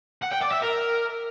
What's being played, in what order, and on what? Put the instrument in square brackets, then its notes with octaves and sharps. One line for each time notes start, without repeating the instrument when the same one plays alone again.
[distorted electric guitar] F#5
G5
D5
E5
A#4